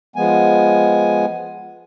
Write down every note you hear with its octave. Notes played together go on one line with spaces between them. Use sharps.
F3 G#3 B3 G#5